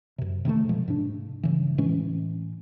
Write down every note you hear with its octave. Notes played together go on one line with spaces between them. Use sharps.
F#2 C3
C3 D#3 G#3 A3
B2 F3 G#3
G#2 C3 D4
G2 C#3 E3
A2 E3 G#3 C#4